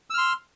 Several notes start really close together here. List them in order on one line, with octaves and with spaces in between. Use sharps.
E6 F6 C6